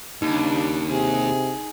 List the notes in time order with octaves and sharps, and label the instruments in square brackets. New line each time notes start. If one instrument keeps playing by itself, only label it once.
[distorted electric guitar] D#2 [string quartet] C#3 G3 D4 [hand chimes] D#4
[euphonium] C3 [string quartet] G#4